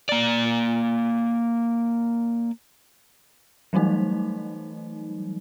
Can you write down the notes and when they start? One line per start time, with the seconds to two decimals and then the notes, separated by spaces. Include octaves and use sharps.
0.09 A#3 D5
3.73 E3 F#3 G3 A3 D#4